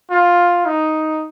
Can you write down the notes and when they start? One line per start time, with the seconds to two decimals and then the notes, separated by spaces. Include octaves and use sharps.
0.11 F4
0.66 D#4